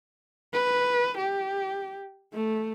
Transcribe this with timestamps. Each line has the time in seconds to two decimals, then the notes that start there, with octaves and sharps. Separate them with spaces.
0.53 B4
1.18 G4
2.33 A3